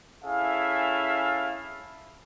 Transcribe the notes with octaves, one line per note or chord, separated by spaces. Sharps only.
C#4 E4 G#4 A4 E5 F5